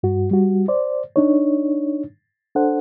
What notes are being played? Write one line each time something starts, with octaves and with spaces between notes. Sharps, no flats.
G2 F#4
G3 F#4
C5 D5
D4 D#4 C#5
D4 A4 C5 F#5